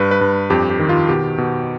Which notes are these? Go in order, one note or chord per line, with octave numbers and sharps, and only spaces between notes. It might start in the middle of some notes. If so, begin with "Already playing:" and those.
Already playing: G2 B4
B4
G2
F2 G4
G4
D#3
F4
B2 G4
B2